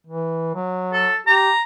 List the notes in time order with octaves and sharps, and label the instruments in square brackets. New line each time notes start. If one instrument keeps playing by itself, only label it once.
[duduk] E3
F#3
[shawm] A4
[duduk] G4 [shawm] A#5